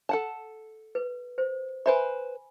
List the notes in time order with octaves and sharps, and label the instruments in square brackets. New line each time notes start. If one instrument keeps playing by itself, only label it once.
[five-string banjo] A4 F#5 A5
[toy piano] B4
C5
[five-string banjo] B4 C5 E5 [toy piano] G#5 B5